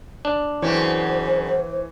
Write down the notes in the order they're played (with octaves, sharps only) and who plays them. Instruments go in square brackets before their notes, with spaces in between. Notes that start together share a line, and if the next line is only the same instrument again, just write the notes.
[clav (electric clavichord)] D4
[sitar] F#2 C#3 C4 [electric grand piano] E3 C#5 [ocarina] C5